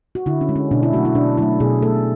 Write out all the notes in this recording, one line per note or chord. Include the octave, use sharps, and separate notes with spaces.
F#4
D3 E4
C#4
G#3
C#4
B2 D4
E4
F#3 A3 F#4
E4
B2 D4
F#3 A3 E4
B2 G#4
A3 A4